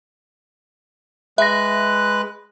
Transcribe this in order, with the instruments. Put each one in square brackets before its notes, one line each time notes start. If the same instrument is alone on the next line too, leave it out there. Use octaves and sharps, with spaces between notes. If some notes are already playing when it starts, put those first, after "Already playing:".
[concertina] G#3 B4 F#6 [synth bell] E5 A#6